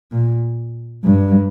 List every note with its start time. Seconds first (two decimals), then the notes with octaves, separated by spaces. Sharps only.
0.12 A#2
1.05 G2